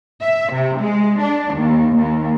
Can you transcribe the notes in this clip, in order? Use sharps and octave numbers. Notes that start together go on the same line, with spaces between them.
E5
C3
G#3
D4
D#2
D#2